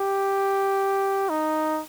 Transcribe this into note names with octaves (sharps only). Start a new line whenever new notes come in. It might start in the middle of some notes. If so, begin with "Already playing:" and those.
Already playing: G4
D#4